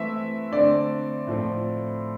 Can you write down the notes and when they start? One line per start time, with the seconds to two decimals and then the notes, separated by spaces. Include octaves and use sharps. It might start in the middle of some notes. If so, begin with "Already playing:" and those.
Already playing: E3 A3 C4 E5
0.52 D3 A3 C4 D5
1.27 A2 F3 A3 C4